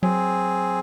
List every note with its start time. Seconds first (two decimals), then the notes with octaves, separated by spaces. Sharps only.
0.03 F#3 C4 G#4